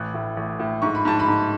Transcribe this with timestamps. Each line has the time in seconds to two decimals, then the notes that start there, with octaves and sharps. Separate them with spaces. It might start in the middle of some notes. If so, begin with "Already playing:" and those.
Already playing: A1 F#6
0.14 A2
0.37 A1
0.59 A2
0.82 G#2 C#6
0.95 B5
1.05 G#2 A5
1.19 B5
1.28 G#2